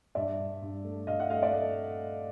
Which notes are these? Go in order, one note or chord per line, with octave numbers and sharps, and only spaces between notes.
G2 D5 E5
G2
G2
A3
G2 D#5 F5
E5 F#5
A3 D#5 F5
D5 E5
A3 D#5